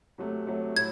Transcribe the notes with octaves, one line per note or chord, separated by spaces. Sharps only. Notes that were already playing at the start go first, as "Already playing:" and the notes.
C3 F#3 A3
C3 F#3 A3
A2 F#3 G#6